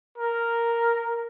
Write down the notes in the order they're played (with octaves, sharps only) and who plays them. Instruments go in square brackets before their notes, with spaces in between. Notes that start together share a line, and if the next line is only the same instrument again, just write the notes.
[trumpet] A#4